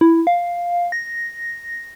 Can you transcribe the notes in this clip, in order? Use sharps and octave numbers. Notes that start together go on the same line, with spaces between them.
E4
F5
A#6